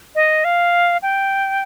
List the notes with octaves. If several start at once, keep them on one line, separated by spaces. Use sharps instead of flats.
D#5
F5
G5